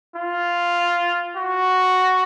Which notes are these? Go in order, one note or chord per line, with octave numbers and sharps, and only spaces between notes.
F4
F#4